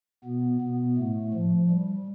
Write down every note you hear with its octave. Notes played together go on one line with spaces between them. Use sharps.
B2 B3
B2 B3
A2 A3
F3
G3